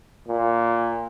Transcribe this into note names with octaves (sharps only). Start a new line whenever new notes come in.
A#2